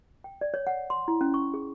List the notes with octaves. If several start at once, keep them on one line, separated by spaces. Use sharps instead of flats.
G5
D5
C#5
F#5
C6
E4
C#4
C#6
G#4